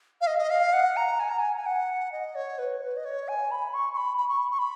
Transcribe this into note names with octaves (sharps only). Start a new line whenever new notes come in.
F5
D#5
D#5
F5
F#5
A#5
G#5
A#5
G#5
G#5
F#5
D#5
C#5
B4
B4
D#5
C#5
G#5
B5
C#6
C#6
B5
B5
C#6
C#6
B5